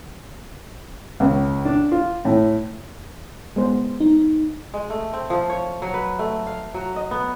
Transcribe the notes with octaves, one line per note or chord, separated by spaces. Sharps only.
C#2
D4
F4
A2
G#3 B3 C5
D#4
G#3
A3
C4
F3
C#5
F#3
B4
A3
F5
F#3
D#5
B3